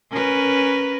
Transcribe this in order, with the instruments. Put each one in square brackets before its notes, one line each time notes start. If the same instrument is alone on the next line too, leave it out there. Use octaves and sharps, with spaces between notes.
[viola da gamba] C#4 A#4 B4